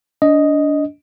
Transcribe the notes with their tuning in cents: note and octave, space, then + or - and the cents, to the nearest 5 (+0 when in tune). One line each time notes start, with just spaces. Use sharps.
D4 -25 D#5 +0